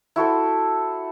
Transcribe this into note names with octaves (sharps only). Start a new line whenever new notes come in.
E4 F#4 A4 C5